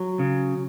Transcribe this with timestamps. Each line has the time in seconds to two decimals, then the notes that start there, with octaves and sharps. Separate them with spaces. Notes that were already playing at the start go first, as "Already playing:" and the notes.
Already playing: F#3
0.19 C#3